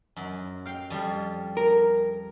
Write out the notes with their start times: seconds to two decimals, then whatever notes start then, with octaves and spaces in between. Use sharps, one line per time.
0.16 F#2
0.66 F5 G5
0.90 F2 G3
1.57 A#4